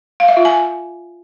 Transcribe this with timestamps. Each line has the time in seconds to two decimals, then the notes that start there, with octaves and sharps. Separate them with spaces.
0.20 F5
0.28 E5
0.37 F4
0.45 G#5